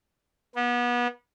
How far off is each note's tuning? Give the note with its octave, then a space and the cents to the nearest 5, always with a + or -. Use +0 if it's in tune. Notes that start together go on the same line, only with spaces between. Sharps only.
B3 -30